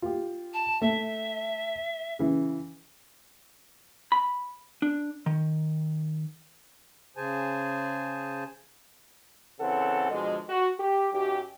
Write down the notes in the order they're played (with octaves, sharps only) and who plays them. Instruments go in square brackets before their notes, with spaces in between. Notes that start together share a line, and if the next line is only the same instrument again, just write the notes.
[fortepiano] F4 G4
[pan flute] A5
[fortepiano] A3 [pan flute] E5
[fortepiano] C#3 E3
[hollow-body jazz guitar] B5
D4
D#3
[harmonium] C#3 G#4 C5 G#5 A5
[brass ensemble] C#3 E3 C4 A4 F#5
B2 D3 F3 G#3
F#4
G4
F#2 F#3 D#4 G4